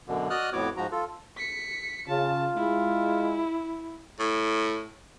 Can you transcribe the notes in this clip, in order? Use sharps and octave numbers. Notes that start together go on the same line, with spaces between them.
F#2 B2 D3
F#4 D5 D#5 D#6 F6 F#6
F2 A2 B3 F#4 C#5 D6
G#2 F3 F#4 A#5
F4 A4
B6 C#7
C#3 F4 A5
G#3 E4
A2